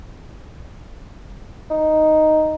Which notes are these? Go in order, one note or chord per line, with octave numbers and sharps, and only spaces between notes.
D#4